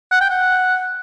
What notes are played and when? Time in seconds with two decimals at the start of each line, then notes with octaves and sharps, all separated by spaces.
0.12 F#5
0.21 G5
0.30 F#5